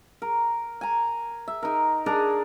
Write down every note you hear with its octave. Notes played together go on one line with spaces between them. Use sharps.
A#4
G#5 A#5
E5
D#4 A#4
D4 G#4 A#4 A#5